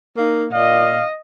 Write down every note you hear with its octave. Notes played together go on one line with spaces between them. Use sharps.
A#3 D#4
A#2 D#5 F5